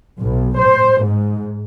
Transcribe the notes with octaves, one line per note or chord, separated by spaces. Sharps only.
B1
C5
G#2